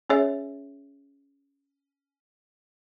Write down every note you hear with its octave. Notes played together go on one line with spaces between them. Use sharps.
C#4 G#4 C#5 E5